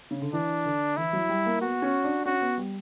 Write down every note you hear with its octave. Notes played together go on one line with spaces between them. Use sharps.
C#3
D3
E3 D4
D3
E3 E4
F#3
G3
A#3
B3 F#4
C#4
D4
C#4 F#4
B3
G3